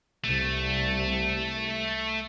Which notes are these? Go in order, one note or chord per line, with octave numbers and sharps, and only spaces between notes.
C2 C3 A3